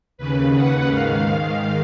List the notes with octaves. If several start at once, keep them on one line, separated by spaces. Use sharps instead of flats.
D#2 C#3 B4
F#5
G#2 D#3 F5
F5